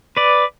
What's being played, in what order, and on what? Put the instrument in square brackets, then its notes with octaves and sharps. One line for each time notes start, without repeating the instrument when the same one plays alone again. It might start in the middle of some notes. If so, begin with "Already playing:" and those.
[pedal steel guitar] B4 D5